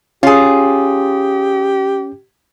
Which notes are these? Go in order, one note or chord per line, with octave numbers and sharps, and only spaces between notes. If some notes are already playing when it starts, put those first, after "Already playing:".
C#4 F4 G4 G#4